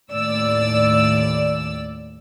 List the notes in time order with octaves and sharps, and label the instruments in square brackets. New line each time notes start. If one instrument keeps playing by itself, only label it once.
[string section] D#2 A2 D5 E6